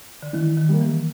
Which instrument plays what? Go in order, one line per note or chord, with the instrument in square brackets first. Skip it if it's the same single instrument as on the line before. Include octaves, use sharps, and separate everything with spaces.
[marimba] D3
[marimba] D#3 [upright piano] E3
[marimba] D#3
[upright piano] G3 A#3
[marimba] E3